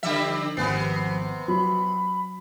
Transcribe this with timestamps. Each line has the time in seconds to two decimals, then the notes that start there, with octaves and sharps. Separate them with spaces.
0.03 D3 F3 G3 E5
0.57 G#1 C3 B3 G#5 C7
1.48 F#3 B5